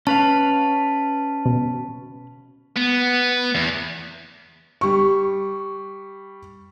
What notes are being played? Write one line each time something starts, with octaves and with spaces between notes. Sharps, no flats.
C#4 B4 F5 A5
B2
B3
E2
G3 C#6